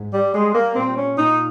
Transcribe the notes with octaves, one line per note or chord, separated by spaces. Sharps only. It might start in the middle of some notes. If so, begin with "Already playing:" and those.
Already playing: G#2
G3
G3 G#3
A#3
A#2 C4
C#4
A#2 D#4